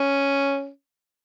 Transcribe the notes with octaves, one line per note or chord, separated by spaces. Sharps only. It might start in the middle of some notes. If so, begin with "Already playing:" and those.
Already playing: C#4